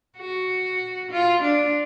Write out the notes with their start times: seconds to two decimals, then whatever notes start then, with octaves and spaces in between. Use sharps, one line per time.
0.18 F#4
1.11 F4
1.42 D4